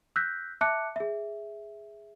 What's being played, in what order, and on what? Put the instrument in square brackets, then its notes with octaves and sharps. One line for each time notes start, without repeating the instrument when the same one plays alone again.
[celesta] E6 F#6 G6 A#6 B6
E5 A5 D6 F#6 C#7
G#4 E5